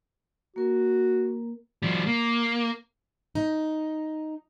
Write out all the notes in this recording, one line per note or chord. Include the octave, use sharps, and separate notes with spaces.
A#3 F#4 A#4
F3 G3
A#3
D#4